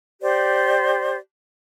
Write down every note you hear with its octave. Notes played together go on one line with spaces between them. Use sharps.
G4 C5 D5